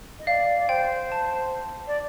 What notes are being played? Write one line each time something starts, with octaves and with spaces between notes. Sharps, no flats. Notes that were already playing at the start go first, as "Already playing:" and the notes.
D#5
D5 F5
D5
C5 G5
A5
D5